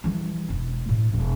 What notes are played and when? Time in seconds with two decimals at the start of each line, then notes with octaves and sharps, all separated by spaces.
0.04 E3 G3
0.49 E1 E4
0.89 A2
1.14 E1